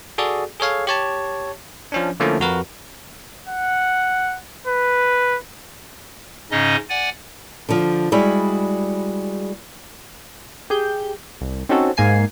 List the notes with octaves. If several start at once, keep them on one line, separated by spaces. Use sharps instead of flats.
F#4 G#4 A4 D5
G#4 A4 C#5 F5
G4 C#5 A5
F3 C#4 D4
D3 F3 A3 A#3 C#4 E4
F2 F#4 A#4 B4
F#5
B4
G#2 C#3 C#4 D#4 D#5
D5 F#5 G#5
D3 F3
G3 G#3 E4 F#4 G#4
G4 G#4 G6
C2
C4 C#4 D#4 F#4 A4
G#2 A#3 G#5 C7